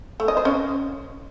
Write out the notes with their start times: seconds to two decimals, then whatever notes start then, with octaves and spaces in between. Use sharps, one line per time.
0.20 A3
0.28 D#5
0.37 C5
0.45 C#4